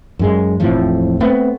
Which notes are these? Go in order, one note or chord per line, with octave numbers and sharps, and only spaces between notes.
F#2 G#3
E1 F2 A2 F3
A3 B3 C4